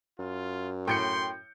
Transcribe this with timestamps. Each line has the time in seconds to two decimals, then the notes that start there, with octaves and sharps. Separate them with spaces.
0.19 F#2 F4
0.88 A2 G5 C6 G6 C#7